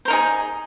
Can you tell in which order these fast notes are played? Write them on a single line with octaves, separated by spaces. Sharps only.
C5 A#4 D#4 G#4